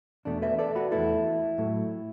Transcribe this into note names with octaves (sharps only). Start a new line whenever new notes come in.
E2 B2 A3 D4
B4 E5
A4 D5
F#4 B4
E2 B2 A3 E4 A4
A2 F#3 A3